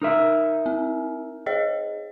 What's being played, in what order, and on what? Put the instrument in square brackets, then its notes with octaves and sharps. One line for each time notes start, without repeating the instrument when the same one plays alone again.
[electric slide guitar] D#4 A#4 E5
[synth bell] C4
G#4 C#5 D#5